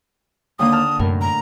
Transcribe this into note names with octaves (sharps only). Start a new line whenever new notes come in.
D#2 D3 A#3 D#6
A5 E6 F6
F#2 A2 C3 A#4
A#5